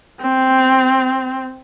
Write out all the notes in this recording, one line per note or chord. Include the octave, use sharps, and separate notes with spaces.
C4